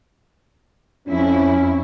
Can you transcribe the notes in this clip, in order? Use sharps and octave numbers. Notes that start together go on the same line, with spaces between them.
F2 C#4 E4